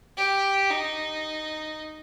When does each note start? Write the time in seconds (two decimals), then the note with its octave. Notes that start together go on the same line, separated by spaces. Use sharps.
0.17 G4
0.70 D#4